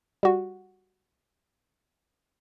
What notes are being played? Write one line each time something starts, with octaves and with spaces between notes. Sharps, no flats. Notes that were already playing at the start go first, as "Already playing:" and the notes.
G3 F#4